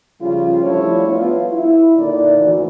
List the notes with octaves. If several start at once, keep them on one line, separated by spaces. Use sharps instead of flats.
C#3 F3 G3 F4
F3 G3 A3 D4 E4 C#5
B3 F4
E4
A#2 D3 D#4 D5
D2 E3